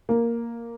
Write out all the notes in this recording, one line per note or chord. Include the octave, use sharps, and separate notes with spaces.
A#3